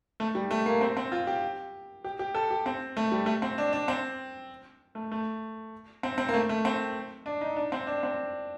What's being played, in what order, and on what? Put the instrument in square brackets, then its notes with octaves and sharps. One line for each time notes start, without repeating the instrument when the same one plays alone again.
[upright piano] A3
G3
A3
A#3
C4
C4
F4
G4
G4
G4
A4
G4
C4
A3
G3
A3
C4
D4
D4
C4
A3
A3
C4
C4
A#3
A3
A3
C4
D4
D#4
D4
C4
D4
C4